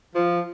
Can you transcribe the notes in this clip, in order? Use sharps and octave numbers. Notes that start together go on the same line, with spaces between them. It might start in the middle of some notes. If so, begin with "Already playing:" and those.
F3